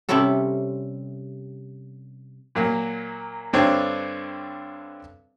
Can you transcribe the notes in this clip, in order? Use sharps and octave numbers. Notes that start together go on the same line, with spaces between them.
C3 G3 C4 C#4 E4 A4
A#2 F#3 A#3
G2 D3 C4 D4 C#5